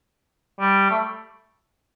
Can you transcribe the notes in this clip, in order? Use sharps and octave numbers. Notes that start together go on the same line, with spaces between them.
G3
A3